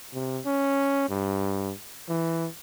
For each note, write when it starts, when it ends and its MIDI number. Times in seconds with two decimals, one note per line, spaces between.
0.13 0.39 48
0.46 1.06 61
1.09 1.71 43
2.09 2.46 52